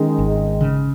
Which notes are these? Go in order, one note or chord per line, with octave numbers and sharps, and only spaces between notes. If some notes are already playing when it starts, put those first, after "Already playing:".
Already playing: D#3 G#3 C#4
G#1
C#3